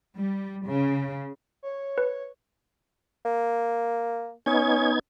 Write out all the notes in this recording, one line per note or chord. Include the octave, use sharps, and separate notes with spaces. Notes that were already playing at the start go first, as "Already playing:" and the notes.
G3
C#3
C#5
B4
A#3
B3 C#4 D#4 G#6